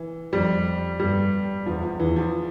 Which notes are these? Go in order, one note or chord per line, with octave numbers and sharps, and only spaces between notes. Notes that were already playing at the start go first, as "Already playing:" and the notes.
Already playing: E3
F2 G3
G2 G3
E2 F3
F3
E2 E3
F3